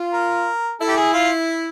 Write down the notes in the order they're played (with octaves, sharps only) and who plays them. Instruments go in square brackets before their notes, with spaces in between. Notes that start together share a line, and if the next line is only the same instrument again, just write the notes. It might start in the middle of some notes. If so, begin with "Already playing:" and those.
Already playing: [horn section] F4
[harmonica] A#4
[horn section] E4 [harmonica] A4
[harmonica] G4
G#4
F4